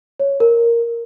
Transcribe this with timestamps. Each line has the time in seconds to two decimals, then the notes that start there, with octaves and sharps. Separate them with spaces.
0.20 C#5
0.40 A#4